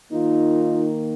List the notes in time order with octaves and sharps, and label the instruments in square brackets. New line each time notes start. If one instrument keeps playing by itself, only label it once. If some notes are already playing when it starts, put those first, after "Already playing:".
[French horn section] D#3 A#3 D#4 F4